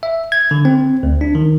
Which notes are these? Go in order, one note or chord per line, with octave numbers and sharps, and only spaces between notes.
E5
G#6
D3
C4
D2
D4
D#3